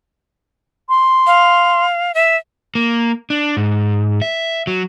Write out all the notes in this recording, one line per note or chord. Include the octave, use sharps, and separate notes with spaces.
C6
F5
E5
A#3
D4
G#2
E5
F#3